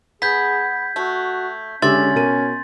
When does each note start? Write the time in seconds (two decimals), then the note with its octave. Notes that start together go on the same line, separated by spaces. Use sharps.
0.22 B3 G#4 G6 G#6 B6
0.96 A3 F#4
1.82 D3 G#3 C#4 G4 E5 C6 A6
2.15 B2 A#4 D#7